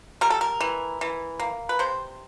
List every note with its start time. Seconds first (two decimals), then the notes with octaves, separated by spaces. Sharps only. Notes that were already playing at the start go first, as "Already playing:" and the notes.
0.21 G3 A#4
0.30 A4
0.41 A#4
0.61 E3
1.01 E3
1.40 A#3
1.69 B4
1.79 C3 C5